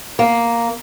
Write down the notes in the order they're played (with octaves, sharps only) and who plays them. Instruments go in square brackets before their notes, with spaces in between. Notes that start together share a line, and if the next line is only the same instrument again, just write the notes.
[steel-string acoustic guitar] A#3